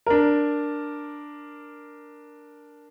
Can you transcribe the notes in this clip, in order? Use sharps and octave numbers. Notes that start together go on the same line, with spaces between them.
D4 A#4